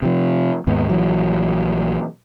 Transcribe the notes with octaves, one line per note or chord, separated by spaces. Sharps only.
C3 F3
D#2 G#2 B3
A#1 E3 F#3